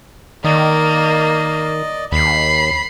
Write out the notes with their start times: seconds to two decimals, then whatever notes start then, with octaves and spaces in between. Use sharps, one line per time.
0.44 D#3 A#3 D5 D#5
2.12 D#2 B5 C7